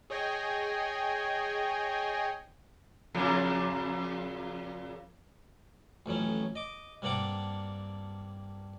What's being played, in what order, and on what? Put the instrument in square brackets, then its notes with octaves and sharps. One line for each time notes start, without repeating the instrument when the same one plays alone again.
[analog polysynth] G#4 C#5 D#5 G5 G#5
[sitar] F2 A#2 C#3
[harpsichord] A1 F2 F#3 C#4
D#5 D6
G2 A#3 C4 D4 F#5 D6